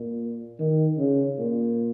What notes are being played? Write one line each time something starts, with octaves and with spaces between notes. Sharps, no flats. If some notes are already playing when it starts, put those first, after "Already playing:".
Already playing: A#2
D#3
C#3
A#2